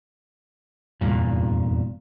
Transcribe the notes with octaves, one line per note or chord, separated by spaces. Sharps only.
F1 E2 G2 A#2